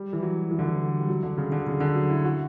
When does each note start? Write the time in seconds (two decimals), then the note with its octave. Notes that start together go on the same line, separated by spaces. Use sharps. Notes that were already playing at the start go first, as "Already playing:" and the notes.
Already playing: G3
0.13 E3
0.23 F#3
0.51 E3
0.59 D3
0.65 E3
1.00 G3
1.09 F#3
1.23 D3
1.38 C#3
1.52 D3
1.67 C#3
1.80 D3
1.95 F#3
2.10 E4
2.25 F#4